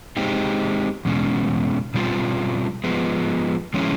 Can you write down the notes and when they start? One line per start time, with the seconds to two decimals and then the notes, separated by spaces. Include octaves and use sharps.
0.17 G#3 C4 D#4 G4
1.05 E2 B2 G#3 C#4
1.94 B2 G3 C4 F4
2.84 F3 G#3 B3
3.74 D3 F3 G#3 C#4 E4